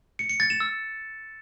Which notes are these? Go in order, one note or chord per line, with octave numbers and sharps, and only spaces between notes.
C#7
C#7
A6
E7
E6